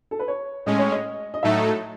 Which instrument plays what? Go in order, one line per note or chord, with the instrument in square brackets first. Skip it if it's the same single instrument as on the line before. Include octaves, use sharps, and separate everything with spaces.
[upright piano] A4
B4
C#5
[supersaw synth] A2 G#3 C#4 [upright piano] D#5
[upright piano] C#5
D#5
D#5
[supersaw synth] A2 F#3 A3 D#4 A4 [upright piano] E5